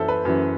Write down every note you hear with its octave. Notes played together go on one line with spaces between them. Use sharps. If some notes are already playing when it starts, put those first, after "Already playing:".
Already playing: F#2 E3 A4 C5 E5
B4
F#2 E3